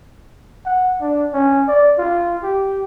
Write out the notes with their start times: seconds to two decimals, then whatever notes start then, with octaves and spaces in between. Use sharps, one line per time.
0.66 F#5
1.01 D4
1.33 C#4
1.68 D5
1.98 F4
2.43 G4